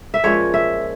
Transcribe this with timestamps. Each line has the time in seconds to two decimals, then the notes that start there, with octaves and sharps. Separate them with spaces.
0.14 E5
0.24 A#2 F3 G#3 C#4 C#5
0.54 E5